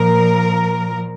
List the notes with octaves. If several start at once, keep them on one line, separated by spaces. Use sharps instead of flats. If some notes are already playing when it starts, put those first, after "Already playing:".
Already playing: A#2 F3 A#4